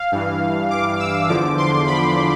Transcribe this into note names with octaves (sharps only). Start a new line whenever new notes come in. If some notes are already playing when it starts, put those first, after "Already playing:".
Already playing: F5
G2 E3
D6
E6
E2 D3 F3 D6
C6
B5